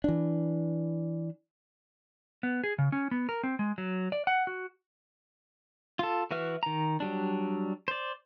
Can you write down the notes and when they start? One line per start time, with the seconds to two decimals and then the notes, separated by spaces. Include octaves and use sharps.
0.04 E3 D4
2.43 B3
2.64 G#4
2.78 C#3
2.92 C#4
3.11 B3
3.29 A#4
3.43 C4
3.59 G#3
3.78 F#3
4.12 D5
4.27 F#5
4.47 F#4
5.99 F4 A4
6.31 E3 F#4 B4 E5 F6
6.63 D#3 A#5
7.00 F#3 G3 D4
7.88 C5 D5